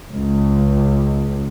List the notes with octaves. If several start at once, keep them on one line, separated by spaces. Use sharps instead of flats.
C#2